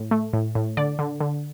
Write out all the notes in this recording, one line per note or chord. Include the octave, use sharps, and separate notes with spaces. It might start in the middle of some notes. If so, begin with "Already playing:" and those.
Already playing: A2
A3
A2
A2
D3 D5
D3
D3